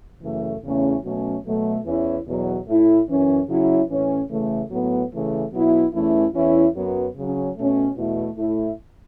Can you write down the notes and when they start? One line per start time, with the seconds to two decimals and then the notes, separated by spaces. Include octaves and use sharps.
0.22 F#2 C#3 E3 A3
0.63 E2 C#3 A3 C#4 E4
1.04 B2 F#3 A3 C#4
1.45 B2 F#3 A3
1.85 E2 E3 C#4 E4
2.26 E2 B2 F#3
2.67 A2 A3 E4
3.08 F#2 E3 C#4
3.48 C#3 F#3 C#4 E4
3.88 A2 E3 C#4
4.30 C#3 E3 A3
4.71 A2 F#3 B3
5.11 C#3 E3 A3
5.52 B2 F#3 B3 E4
5.92 E2 E3 A3 C#4 E4
6.34 E2 E3 C#4 E4
6.74 F#2 F#3 B3
7.16 C#3 F#3 C#4
7.57 B2 A3 C#4
7.96 E2 B2 A3 E4
8.37 A2 A3 E4